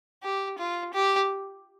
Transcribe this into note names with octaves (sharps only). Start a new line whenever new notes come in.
G4
F4
G4